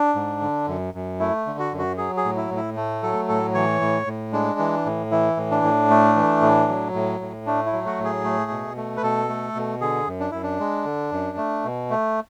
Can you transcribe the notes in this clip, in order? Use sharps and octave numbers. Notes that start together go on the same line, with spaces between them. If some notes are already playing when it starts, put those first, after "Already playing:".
Already playing: D4
G#2
D3
F#2
F#2
A3 E4
D3
F#4
F#2
F#4
F#3 G#4
G#4
A2
E4
A2
E4
A3
F#3 A4
A2 A4
E3 C#5
A2
A2
G#3 D4
E3
A2
E3 E4
A2
D4
A2
A3
E3
A2
F#3
A2
A2
A3 D4
E4
F#3
F#4
A2
G#4
A3
B2
A3
B4
B2 A4
A3
B2
D3 G#4
F#2
D4
F#2 E4
D4
G#3
D3
F#2
A3
B2
A3